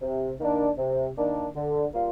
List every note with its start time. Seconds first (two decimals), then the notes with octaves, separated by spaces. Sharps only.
0.02 C3
0.40 D#3 A#3 D4
0.78 C3
1.17 D#3 A#3 D4
1.56 D3
1.94 G3 A#3 F4